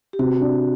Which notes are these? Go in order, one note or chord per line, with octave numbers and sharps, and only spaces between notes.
G4
C3 F#4
D4